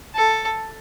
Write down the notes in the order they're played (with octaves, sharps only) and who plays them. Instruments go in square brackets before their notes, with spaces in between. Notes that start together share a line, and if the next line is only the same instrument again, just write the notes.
[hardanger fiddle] A4